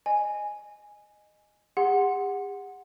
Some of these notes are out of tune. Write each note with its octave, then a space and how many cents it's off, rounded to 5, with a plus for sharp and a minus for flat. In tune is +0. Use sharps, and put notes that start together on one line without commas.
D#5 -15 G#5 +0
G4 +45 F#5 +0 C6 +0